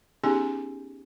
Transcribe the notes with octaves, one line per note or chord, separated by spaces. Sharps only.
B3 C#4 D#4 G4 G#4 G#5